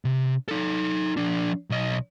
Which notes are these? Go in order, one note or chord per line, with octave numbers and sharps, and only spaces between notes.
C3
D#4 A4
F3 D4
B1 D#5